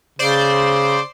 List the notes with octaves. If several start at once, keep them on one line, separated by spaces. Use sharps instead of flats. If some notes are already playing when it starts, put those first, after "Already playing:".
C#3 C5 D5 C6